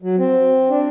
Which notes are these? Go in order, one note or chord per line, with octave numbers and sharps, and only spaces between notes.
F#3
C4
D4